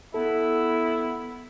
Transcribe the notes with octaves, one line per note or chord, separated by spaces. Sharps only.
B3 E4 A4